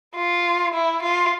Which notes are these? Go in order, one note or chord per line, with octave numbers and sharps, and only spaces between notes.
F4
E4
F4